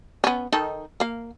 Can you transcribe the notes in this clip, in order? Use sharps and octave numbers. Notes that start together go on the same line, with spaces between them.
B3 C#4
D#3 D#4 A4
A#3 F5